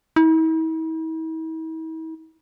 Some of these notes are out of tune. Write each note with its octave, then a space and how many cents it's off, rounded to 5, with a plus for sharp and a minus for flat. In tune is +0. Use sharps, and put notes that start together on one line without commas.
E4 -45